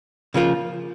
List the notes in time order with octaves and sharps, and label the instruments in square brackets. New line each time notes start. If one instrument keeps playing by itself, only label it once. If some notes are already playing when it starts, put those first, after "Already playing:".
[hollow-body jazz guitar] C#3 F3 A#3 F4